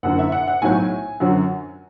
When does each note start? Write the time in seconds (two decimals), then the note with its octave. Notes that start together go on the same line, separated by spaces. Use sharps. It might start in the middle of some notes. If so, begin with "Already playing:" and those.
0.03 F#1 F#2 D3 F#5
0.19 E5
0.32 F#5
0.48 F#5
0.62 B1 A2 F#3 G#5
1.20 F#2 D3 F#3